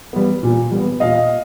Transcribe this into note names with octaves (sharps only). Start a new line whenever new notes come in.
G3 B3
A#2
G3 B3
A#2 D#5 F5